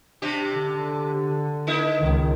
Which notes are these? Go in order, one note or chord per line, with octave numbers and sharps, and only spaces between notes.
C3 D4 G4
D3
A#3 D#4 E4
C#2 D#3